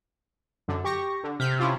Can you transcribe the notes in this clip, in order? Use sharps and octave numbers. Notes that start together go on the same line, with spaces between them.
F#2 D3
G4 C#6 A#6
D3
C3 F6 G6 B6
C#4 E4 F4